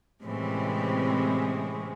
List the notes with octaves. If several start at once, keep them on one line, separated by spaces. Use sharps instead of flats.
A2 C3 E3 G#3 C4 C#4